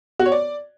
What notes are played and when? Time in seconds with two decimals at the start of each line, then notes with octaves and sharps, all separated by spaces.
0.19 F#4
0.26 C#5
0.32 D5